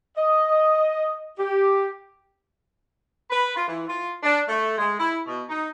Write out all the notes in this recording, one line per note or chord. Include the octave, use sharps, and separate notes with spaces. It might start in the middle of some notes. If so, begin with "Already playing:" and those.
D#5
G4
B4
F4
E3
F4
D4
A3
G#3
E4
B2
D#4